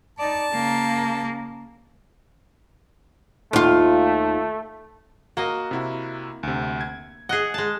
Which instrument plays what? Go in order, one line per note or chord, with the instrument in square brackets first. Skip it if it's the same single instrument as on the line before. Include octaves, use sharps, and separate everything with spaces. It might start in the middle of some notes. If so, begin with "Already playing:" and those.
[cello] D#4 D5 [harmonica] A5
[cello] C#3 A#3
[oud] D#2 F4 [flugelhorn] A3
[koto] A#3 D#5 [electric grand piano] F#4
[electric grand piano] C3 E4 F#4
D2 C3
G#6
[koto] G#4 D#5 [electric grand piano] F#5 F#6
[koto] G#3 A5